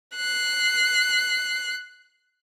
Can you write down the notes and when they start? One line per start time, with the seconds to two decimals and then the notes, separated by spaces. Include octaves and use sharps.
0.15 F#6 C7